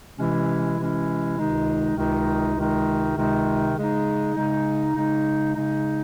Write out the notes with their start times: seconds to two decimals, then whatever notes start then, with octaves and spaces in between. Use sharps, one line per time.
0.18 C3 E3 G#3 C#4 E4
0.79 C3 E3 G#3 C#4 E4
1.38 C#2 C3 D#3 G#3 D#4
1.97 C#2 C3 D#3 G#3 D#4
2.56 C#2 C3 D#3 G#3 D#4
3.16 C#2 C3 D#3 G#3 D#4
3.76 C#3 G#3 D#4
4.35 C#3 G#3 D#4
4.95 C#3 G#3 D#4
5.55 C#3 G#3 D#4